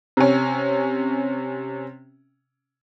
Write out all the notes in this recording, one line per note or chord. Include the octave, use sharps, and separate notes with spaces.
C3 C#4